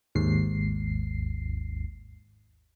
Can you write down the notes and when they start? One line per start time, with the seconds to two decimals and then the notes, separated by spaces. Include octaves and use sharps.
0.15 G#1 D#2 G#2 C7